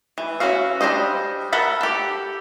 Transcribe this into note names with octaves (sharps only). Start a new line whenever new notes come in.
E3
C#4 E4 F#4 F5
G3 D4 A4 C5 D#5
A4 A#4 F#5 A5 B5
G4 A4